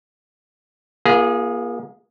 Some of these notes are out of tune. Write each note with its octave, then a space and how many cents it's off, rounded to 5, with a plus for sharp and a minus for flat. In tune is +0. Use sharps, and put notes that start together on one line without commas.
A#3 +35 F4 -25 G#4 -10